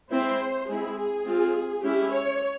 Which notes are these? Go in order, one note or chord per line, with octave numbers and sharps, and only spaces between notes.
G#3 C4 E4 C5
G#3 C4 E4 G#4
G#4
G#3 C4 F4
G#3 C#4 E4 G4
C#5